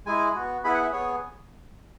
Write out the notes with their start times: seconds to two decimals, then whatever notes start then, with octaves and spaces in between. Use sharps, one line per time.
0.06 G#3 E4 G#4 G#5
0.35 B3 F#4
0.64 B3 E4 G#4 B5
0.74 F#5
0.83 E5
0.92 B3 G#4 C#5